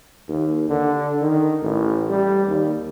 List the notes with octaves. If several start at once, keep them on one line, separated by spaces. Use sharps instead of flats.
D#2
D3
D#3
A1
G3
D#2